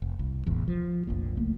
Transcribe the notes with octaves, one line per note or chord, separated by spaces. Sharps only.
F1
C2
E1 A1 E2
F3
F1 A#1 A#2
C#2 A3 A#3